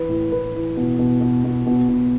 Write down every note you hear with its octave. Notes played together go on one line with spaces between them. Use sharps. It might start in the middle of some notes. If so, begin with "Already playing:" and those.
Already playing: E3 B4
A2
A2 B4
E3
B2
B2
B2
B2
B2
B2